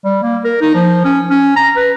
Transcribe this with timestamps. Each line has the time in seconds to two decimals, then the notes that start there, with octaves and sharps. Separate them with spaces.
0.05 G3
0.23 A#3
0.45 A#4
0.61 D#4
0.75 F3
1.05 C#4
1.30 C#4
1.56 A#5
1.76 B4